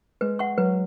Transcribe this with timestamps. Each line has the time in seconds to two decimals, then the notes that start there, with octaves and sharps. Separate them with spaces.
0.21 G#3 B4
0.39 F#5 C#6
0.58 F#3 B4